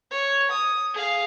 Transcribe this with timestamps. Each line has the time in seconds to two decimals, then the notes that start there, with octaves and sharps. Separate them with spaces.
0.11 C#5
0.52 D#6
0.94 G#4 F5